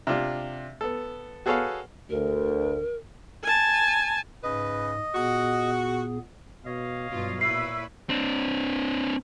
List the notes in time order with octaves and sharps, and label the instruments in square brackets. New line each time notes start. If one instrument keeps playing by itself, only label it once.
[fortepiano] C3 D4 F4
B3 A4
F#4 G#4 A4 B4 C#5 F5
[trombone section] D2 [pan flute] A#4
[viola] G#5 A5
[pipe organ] G#2 [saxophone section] C#3 B4 [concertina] D#5
[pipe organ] A#2 B3 G#4 [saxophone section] F#4
[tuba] B2 [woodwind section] C#5 D#5 F5
[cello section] G2 F#3 F4 [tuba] B2
[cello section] A#2 E4 B4 [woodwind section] C#5 E5 E6 [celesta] C7
[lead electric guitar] C4 D4